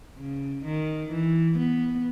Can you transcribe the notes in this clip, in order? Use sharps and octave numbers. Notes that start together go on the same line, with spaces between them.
C#3
D#3
E3
B3